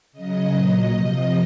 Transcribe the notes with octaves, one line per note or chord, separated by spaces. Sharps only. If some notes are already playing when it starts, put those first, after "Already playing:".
C#3 F#3 D#5
A#2 F#3
C3 F3